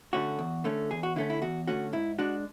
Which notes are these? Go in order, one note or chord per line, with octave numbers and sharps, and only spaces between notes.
D3 A3 C#4 F#4
E2
D3 A3 C#4
E2 G#4
F#4
D3 A3 C#4 E4
E4
E2 F#4
D3 A3 C#4 F#4
G#2 E4
G#3 D4 F#4